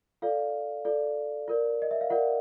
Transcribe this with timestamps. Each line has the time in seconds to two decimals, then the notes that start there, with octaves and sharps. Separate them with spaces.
0.22 F4 A4 D5 F5
0.85 F4 A4 D5
1.48 F4 A#4 D5
1.82 D#5
1.91 E5
2.01 F5
2.10 F4 A#4 D5 F#5